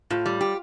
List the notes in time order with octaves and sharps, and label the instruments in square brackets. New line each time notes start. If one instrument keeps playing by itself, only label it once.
[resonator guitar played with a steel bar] A2 [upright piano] F4
[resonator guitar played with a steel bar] G3
G4